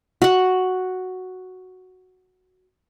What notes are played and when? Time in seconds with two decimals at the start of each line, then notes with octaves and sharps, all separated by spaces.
0.22 F#4 F#5